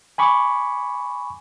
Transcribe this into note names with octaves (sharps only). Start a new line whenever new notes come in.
G#5 B5 C#6 D6